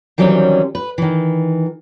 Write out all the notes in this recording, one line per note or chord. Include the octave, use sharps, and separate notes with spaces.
D#3 E3 F#3 G3 C4 C#4
B4
D#3 E3